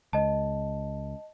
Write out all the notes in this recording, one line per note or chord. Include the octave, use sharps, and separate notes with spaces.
C#2 D#5 A5